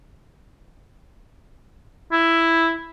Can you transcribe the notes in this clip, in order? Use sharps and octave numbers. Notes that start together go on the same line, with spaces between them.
E4